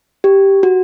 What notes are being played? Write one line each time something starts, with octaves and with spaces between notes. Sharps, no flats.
G4
F#4